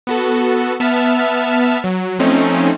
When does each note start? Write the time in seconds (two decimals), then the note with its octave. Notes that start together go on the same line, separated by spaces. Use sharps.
0.07 B3 F#4 A4
0.80 B3 E5 A5 F6
1.84 F#3
2.19 F3 A3 C4 C#4 D#4